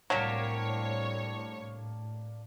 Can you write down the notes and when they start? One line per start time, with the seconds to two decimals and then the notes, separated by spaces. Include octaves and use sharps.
0.10 C2 A2 F#3 A#3 D4 G4 C#5